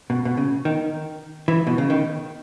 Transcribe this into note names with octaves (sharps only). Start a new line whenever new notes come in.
B2
B2
C#3
D#3
E3
B2
C#3
D#3